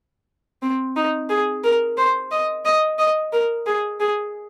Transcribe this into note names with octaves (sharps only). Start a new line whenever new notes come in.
C4
D#4
G#4
A#4
C5
D#5
D#5
D#5
A#4
G#4
G#4